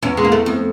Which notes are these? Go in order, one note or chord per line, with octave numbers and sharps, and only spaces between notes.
E2 C#4
G#3
A#3
A3
F2